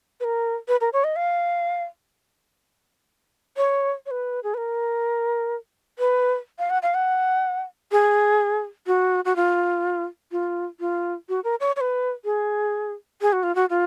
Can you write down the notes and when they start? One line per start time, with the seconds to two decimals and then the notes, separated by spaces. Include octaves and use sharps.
0.20 B4
0.24 A#4
0.68 B4
0.81 A#4
0.93 C#5
1.04 D#5
1.16 F5
3.57 C#5
4.06 C#5
4.11 B4
4.43 G#4
4.54 B4
4.57 A#4
5.99 B4
6.59 F5
6.70 F#5
6.82 F5
6.94 F#5
7.92 G#4
8.87 F#4
9.25 F#4
9.36 F4
10.32 F4
10.80 F4
11.29 F#4
11.44 A#4
11.60 C#5
11.76 C#5
11.81 B4
12.25 G#4
13.21 G#4
13.33 F#4
13.43 F4
13.55 F#4
13.70 F4